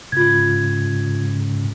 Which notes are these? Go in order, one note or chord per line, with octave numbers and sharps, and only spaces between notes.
G#2 C#3 F4 G#6